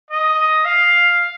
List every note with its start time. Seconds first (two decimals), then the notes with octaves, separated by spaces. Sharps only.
0.11 D#5
0.65 F5